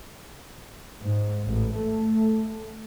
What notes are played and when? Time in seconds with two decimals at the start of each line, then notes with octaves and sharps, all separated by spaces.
1.02 G#2
1.46 A1
1.77 A3